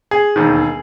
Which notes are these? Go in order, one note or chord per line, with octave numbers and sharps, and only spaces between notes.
G#4
E1 D#2 D#3